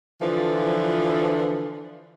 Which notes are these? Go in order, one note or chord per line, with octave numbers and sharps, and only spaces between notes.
D3 E3 F3